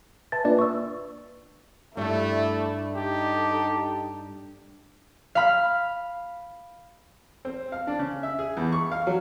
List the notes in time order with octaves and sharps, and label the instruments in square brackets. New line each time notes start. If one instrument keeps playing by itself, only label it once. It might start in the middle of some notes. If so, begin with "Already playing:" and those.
[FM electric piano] B4 E5 G#5 [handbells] A5 A6
[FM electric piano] A#3 D4 F4 [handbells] B4 D5
[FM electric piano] E5 [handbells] C#6 E6
[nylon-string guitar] G2 [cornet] A3 [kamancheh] E4 D5
[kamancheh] D#4 A4 [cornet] G4
[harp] F5 B5 F6
[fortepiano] C4
F5
D4
C#3
E5
G#4
E2
C#6
F5
F#3